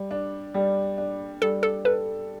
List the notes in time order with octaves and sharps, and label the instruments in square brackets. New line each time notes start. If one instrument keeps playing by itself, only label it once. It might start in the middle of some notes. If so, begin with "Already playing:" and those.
Already playing: [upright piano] G3
D4
G3
D4
[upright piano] G3 [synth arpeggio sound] A4
[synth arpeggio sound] A4
[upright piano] A4 [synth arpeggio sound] B4